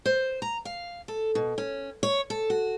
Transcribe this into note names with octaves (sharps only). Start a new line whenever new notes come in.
C5
A#5
F5
A4
B2
C#4
C#5
A4
F#4